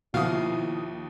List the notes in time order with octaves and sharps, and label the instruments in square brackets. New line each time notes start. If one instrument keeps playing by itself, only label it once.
[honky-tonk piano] D#2 D#6 [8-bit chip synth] B2 F5 [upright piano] F3 [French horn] E4